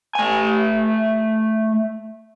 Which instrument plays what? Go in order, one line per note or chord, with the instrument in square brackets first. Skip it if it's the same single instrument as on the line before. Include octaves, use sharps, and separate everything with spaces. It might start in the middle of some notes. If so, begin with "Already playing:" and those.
[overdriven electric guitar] A3 G#5